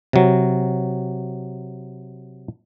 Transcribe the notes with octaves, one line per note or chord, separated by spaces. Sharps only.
C3 F#3